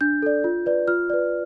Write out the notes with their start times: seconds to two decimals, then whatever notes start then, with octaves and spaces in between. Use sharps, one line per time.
0.01 D4 G6
0.22 A4 D5
0.44 F4
0.66 B4 D5
0.87 F4 F6
1.10 B4 D5